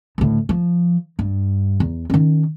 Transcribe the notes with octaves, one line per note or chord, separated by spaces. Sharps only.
D2 A2
F3
G2
E2
D#3 C#4